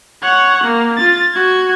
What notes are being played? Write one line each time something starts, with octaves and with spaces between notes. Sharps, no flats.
C#5 F#5
A#3
F4 A6
F#4 G#6